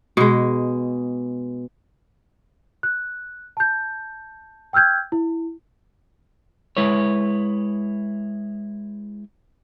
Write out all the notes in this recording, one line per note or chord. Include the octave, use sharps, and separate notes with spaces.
B2 G#3
F#6
A5 G6
G5 E6 F6 G6 G#6
E4
G#3 E4 B4 C#5